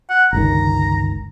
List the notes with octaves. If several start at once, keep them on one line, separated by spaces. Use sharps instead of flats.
F#5
G1 C#2 D#3 A#5